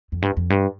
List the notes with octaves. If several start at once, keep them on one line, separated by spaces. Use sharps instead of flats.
F2
G2
F2
G2